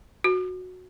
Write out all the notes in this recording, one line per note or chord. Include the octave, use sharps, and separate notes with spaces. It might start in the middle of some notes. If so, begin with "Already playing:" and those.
F#4